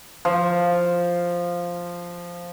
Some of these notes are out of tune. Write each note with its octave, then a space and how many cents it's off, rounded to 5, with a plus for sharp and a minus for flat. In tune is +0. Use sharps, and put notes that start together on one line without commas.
F3 +0